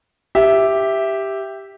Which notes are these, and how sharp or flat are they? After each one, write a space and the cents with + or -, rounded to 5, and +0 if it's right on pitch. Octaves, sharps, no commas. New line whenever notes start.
G4 +0 E5 +0